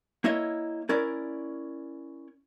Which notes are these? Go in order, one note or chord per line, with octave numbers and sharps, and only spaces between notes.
A#3 E4 C#5 D#5 E5
C#4 E4 A#4 D5